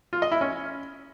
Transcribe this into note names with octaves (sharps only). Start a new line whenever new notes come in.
F4
D#5
E4
C#4